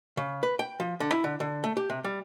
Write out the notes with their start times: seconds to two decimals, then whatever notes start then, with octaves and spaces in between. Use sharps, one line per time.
0.17 C#3
0.43 B4
0.59 G5
0.80 F3
1.00 D3
1.12 E4
1.24 D3
1.40 D3
1.64 A3
1.77 G4
1.90 C3
2.04 G3